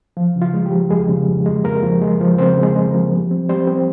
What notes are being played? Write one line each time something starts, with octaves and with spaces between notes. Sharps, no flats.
F3 F4
C#3
F4
G#3
G3 G4
F3
F2 G#3 G#4
C#3
F2
G#3
F2 A#3 A#4
F3
G#3
F3
C#3 C4 C5
C#3
G#3 G#4
G#3
A#3 A#4
F3
G3
C4
G3 C4 C5
C4